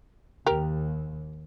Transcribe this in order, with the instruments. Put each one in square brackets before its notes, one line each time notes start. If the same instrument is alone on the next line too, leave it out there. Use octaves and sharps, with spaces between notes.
[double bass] D#2 [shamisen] G4 A#4